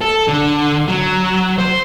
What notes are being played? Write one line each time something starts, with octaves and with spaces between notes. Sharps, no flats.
A4
D3
F#3
C5